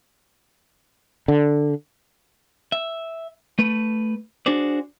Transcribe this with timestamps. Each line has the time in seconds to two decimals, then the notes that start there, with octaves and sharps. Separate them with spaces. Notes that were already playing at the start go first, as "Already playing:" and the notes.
1.28 D3
2.72 E5
3.59 A3 B4
4.46 D4 F#4 G#4 C5 D5